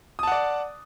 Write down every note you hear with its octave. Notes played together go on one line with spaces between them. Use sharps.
D5 F#5 A5 D#6